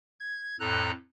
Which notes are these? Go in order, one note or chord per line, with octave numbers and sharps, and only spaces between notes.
G#6
F2 A2 A4 A#5 F#6